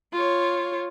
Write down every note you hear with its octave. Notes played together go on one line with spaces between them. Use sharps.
F4 C#5